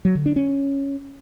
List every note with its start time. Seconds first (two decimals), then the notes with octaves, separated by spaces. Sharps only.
0.05 F#3
0.15 D3
0.26 D4
0.36 C#4